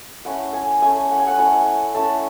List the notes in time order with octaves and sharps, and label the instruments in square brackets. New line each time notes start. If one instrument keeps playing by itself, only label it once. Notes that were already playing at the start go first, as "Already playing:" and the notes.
[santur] A3 C#4 E4 F#5
G#5
A3 C#4 E4 G#5
F#5
G#5
F#5
A3 C#4 E4 G#5
A3 C#4 E4 A5